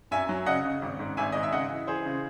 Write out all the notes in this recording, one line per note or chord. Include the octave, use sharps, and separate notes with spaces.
F#2 E5 G#5
F#3
C#3 D#5 F#5
C#3
G#1
G#2
G#1 E5 G#5
G#2 D#5
E5
C#3 D#5 F#5
E3
E3 G#4 C5
C#3